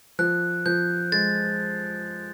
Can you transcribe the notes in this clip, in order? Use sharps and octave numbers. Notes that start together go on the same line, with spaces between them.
F3 F#6
F3 G6
G#3 A6